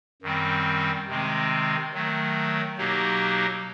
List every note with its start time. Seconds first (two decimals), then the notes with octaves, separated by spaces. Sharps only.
0.22 F#2 D#3 G3 C4
1.08 C3 D#3 G#3 C4
1.93 D#3 F#3 A3
2.78 B2 F#3 A#3 D#4 G4